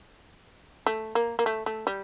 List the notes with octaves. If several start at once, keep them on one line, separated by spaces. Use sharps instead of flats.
A3
A#3
A#3
A3
A3
G3